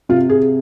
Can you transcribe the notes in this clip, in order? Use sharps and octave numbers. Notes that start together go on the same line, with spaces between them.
C3 F4
G#4